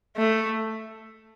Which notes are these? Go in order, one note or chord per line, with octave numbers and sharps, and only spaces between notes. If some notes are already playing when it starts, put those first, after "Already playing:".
A3